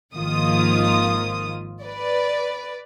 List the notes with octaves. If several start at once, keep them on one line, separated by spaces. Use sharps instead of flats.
G#1 D#3 F3 A#3 F4 D#6
B4 D5